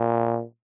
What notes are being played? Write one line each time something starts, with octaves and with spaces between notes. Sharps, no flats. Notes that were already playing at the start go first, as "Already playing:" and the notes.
Already playing: A#2